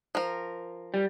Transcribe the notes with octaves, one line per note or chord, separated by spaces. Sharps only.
F3 A#4
G3